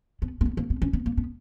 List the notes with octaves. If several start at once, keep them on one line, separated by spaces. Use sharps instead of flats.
B3
A#3
B3
A#3
B3
C#4
B3
A#3
B3